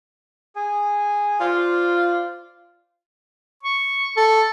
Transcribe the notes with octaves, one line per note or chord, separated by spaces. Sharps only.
G#4 G#5
F4 C5 D5
C#6
A4